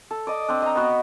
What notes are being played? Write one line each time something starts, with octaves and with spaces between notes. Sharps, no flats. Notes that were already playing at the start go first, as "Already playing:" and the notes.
A4
D5 D#5 D#6
C4 D4
D#5 A#5
B3 F#4